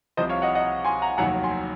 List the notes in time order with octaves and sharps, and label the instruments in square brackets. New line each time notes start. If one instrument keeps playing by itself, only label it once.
[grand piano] C2 C3 F3 C5 D#5
C#5 F5
D#5 F#5
D#5 F#5
G#5 C6
F#5 A#5
F1 D#2 D#3 F#3 F#5 A#5
G#5 C6